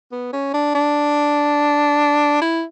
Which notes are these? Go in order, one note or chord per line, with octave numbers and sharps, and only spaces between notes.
B3
C#4
D4
D4
E4